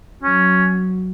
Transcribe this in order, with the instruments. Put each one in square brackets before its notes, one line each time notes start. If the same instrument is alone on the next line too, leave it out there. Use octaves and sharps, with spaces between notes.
[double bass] F#3 [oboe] C#4